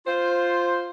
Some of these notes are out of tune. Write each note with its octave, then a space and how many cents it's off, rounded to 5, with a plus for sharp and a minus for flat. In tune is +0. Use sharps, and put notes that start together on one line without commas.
F4 +0 C5 +0